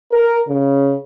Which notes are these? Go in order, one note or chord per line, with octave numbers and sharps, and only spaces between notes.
A#4
C#3